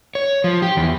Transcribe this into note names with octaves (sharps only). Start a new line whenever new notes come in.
C#5
F3
G4
E2